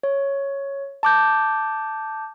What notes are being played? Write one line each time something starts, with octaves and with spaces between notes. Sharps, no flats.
C#5
A5 D6 G6